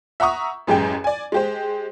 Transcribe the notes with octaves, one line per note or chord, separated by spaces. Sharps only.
E5 F#5 A#5 C#6 D#6
A1 F#2 G#3 G4 G5
D5 G#5
G#3 G4 C5